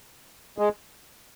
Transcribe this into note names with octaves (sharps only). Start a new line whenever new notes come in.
G#3